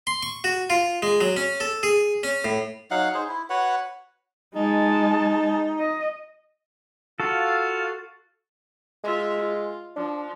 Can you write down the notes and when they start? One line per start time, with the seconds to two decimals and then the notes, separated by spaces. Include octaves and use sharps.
0.07 C6
0.23 C#6
0.44 F#4
0.70 F4
1.02 G#3
1.21 F#3
1.36 C#4
1.60 A4
1.83 G#4
2.23 C#4
2.44 A2
2.91 F#3 D#4 F5 F#5
3.14 D#4 G#4 C5
3.29 E4
3.50 F#4 B4 C#5 F#5
4.55 G#3 D#4 A5
5.79 D#5
7.20 F4 F#4 A4 F5
9.04 G#3 F4 E5
9.39 F4
9.96 F3 D4